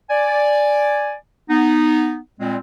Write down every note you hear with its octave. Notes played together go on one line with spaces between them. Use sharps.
D5 G#5
B3 D#4
A#2 G3 G#3 C4